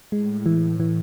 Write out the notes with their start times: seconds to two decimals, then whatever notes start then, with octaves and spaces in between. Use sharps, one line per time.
0.12 A2 G#3
0.46 E3
0.80 E3